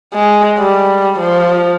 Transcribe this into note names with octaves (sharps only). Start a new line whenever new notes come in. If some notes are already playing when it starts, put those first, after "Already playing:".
G#3
G3
F3